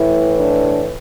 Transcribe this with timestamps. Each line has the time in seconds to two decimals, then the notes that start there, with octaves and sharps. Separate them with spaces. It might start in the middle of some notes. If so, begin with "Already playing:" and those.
Already playing: A2 E3 E4
0.37 D4